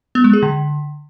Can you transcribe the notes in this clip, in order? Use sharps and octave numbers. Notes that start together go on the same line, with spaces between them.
B3
G#3
G#4
D3